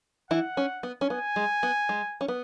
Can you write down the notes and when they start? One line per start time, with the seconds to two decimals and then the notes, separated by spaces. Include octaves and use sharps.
0.31 E3 E4 F#5
0.57 C#4
0.83 B3
1.01 C#4
1.10 B3 G#5
1.36 G#3
1.63 B3
1.89 G#3
2.21 C#4
2.28 B3